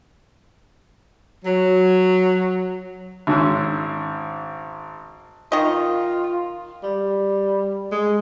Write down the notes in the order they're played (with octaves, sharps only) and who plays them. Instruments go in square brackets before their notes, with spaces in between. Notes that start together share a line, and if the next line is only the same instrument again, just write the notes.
[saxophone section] F#3
[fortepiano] G#1 G#2 C#4 E6
[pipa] D#3 D#5 [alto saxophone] F4
[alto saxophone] G3
G#3